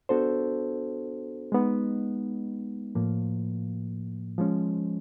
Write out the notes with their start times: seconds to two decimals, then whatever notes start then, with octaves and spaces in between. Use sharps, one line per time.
0.09 B3 D4 F#4 A4 C5
1.52 G#3 B3 D#4
2.95 A2 F3 A#3
4.38 F3 G#3 C#4